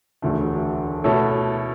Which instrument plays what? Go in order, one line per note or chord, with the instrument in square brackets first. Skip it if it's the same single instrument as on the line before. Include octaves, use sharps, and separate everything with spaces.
[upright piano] E1 D2 D3 A3
B2 A3 E4 A4 C#5